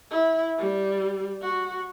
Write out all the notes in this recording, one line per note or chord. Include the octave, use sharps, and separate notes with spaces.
E4
G3
F#4